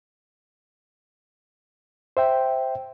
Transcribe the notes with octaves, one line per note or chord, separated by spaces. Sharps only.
C5 E5 G5